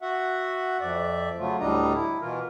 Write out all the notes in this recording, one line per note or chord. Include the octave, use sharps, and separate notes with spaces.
F#4 E5 F#5
F2 D5 E5
C#3 F#3 A3 F4
D2 A2 G3 D4 D#5 A#5
E4
B2 E3 F4 A#4